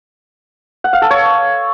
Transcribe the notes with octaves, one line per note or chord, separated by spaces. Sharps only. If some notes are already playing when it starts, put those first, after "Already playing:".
F#5
F5
A4
C#5